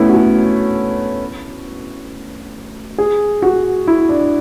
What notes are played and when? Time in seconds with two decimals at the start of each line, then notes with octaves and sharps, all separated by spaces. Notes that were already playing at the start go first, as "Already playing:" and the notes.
Already playing: A3 B3 C#4 E4
0.09 F#4
2.98 G#4
3.42 F#4
3.87 E4
4.09 D4